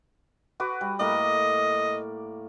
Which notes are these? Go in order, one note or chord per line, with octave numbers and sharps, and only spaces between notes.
F#4 B4 D6
G3
A2 A#3 D5 D#5